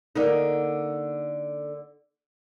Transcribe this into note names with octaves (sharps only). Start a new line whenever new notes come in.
D3 A#3 D#4